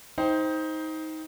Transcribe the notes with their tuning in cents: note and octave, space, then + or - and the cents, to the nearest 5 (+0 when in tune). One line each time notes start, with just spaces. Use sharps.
D#4 +20 C5 +0 G5 +0